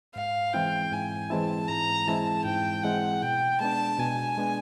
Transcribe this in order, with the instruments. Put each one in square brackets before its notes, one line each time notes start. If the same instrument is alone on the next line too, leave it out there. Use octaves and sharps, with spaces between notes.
[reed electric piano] G#2 [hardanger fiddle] F5
[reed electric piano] E3 G#3 C4 E4 [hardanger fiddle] G5
[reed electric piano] G#2 [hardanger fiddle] G#5
[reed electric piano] E3 G#3 C4 E4 [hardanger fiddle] A5
[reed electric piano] G#2 [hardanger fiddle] A#5
[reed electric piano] E3 G#3 C4 E4 [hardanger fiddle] A5
[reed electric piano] G#2 [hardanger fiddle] G5
[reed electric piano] E3 G#3 C4 E4 [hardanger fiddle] F#5
[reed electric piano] B2 [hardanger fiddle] G5
[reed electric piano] G#3 B3 D4 [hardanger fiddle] A5
[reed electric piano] B2 [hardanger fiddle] G#5
[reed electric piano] G#3 B3 D4